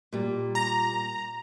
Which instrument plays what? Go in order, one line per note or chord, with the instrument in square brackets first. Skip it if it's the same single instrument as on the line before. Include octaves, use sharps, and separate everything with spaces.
[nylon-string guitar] A#2 G3
[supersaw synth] A#5